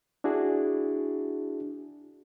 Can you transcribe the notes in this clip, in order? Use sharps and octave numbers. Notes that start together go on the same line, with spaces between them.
D4 E4 F#4 G#4